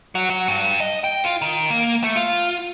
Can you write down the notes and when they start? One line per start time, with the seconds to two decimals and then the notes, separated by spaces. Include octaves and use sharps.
0.15 F#3
0.30 F#3
0.48 G2
0.80 D#5
1.04 G5
1.24 F4
1.42 D#3
1.70 A#3
2.04 A3
2.16 F4